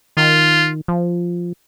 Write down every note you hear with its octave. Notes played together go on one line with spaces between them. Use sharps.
D#3 F4
F3